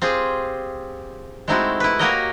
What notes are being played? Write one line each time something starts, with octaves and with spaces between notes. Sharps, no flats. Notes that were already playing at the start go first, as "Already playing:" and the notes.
C4 F4 G4 G#4
G#3 A3 C4 D#4 E4 F#4
E4 B4
A#3 F#4 G4 A#4 C#5 D#5